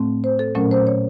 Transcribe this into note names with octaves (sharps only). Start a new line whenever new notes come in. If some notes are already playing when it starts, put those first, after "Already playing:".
Already playing: A2 A3 C4
C5
A4
A#2 F#3 A3 C#4 A#4
C5
C#5